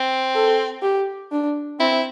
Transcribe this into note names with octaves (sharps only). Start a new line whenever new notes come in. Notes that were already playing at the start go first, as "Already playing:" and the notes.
Already playing: C4
A4
G4
D4
C4 E4